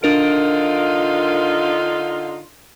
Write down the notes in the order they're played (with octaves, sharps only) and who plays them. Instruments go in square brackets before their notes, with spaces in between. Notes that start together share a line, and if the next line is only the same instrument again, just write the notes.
[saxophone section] D3 D#4 F4 [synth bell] D4 A#4 D7